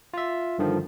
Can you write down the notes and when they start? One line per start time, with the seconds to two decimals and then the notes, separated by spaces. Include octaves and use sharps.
0.14 F4 E5
0.59 G2 D3 D#3 F3